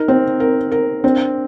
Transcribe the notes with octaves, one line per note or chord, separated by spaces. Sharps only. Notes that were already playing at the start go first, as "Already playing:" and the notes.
Already playing: D#4 A#4
C4
A#4
A#4
C4 D4